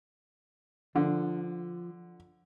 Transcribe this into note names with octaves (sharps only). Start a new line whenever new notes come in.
D3 F3